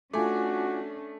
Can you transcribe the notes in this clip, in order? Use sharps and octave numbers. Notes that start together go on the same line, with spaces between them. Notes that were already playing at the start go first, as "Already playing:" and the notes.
A3 C#4 D4 F4 F#4 G#5 D6